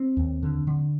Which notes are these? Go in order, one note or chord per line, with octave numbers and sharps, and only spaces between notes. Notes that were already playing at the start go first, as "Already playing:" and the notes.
Already playing: C4
D#2
D3
D3